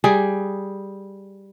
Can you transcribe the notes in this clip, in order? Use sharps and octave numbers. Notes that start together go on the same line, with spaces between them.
G3 G#4